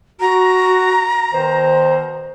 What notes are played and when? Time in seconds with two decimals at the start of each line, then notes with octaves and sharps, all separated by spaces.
0.21 F#4 A#5
1.33 B2 D#3 C5